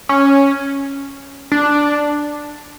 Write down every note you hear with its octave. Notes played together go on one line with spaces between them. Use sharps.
C#4
D4